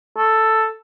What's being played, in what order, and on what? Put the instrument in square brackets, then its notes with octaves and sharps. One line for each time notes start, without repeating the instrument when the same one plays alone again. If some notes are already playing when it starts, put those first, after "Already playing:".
[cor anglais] A4